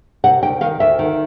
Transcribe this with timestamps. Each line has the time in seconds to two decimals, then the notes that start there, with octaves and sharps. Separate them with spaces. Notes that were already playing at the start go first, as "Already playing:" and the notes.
0.24 C3 F#5
0.43 D2 G5
0.61 D#3 F5
0.80 D2 E5
0.99 D#3